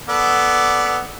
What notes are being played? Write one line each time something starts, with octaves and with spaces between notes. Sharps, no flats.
B3 A4 D5